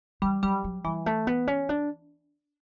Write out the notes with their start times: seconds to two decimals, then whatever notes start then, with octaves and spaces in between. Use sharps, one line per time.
0.22 E3 G3
0.43 F#3 G3
0.64 F#3
0.85 E3 G3
1.06 A3
1.27 B3
1.47 C#4
1.69 D4